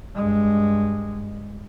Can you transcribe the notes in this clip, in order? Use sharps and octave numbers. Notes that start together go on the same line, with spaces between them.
G2 G#3